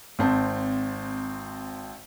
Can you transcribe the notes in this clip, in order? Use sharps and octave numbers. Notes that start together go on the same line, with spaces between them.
G#1 C4 A5